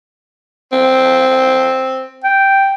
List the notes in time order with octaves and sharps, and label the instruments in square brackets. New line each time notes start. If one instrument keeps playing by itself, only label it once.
[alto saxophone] C4
[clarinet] G5